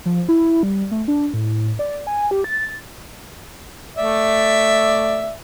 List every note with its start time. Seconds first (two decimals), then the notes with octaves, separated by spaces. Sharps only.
0.06 F3
0.29 E4
0.63 G3
0.91 A3
1.08 D4
1.34 A2
1.79 D5
2.07 G#5
2.31 G4
2.44 A6
3.96 A3 D5 E5